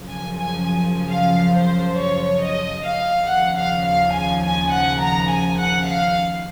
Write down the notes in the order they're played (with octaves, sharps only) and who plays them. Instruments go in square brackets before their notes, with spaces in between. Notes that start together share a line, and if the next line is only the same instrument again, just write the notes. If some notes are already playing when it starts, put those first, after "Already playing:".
Already playing: [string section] F#2 C#3 F3
G#5
G#5
G#5
F5
C5
C#5
D#5
F5
D#2 C#3 F3 F#5
F5
F5
G#5
G#5
F#5
A#5
G#5
F#5
F5